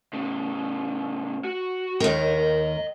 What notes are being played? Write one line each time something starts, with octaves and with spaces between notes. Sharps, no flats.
A2 C#3
F#4
D#2 A#4 D#5 G5